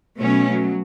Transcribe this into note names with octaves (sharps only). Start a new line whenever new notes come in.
B2 F#3 A3 C#4
F#3